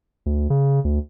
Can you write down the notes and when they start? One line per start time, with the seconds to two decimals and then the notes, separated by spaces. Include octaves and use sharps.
0.26 D2
0.50 C#3
0.85 D2